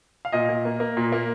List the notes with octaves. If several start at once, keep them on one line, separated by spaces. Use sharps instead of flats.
F5
A#2 D#5
A#2
A#3
A#3
A#2
A#3